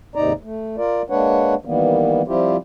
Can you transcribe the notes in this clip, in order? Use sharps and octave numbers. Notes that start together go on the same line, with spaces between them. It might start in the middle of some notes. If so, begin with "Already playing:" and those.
D#2 G#2 C3 D#4 D5 A#5
A3
F4 A#4 D5
G#3 A#3 D4 B4 C#5 F#5
D#3 E3 G3 A#3 B3
F3 G3 C4 E4 F4 G4